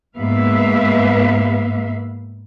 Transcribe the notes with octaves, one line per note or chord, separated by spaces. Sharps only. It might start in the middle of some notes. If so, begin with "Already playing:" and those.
G#2 A#3 B3 B4 E5 F5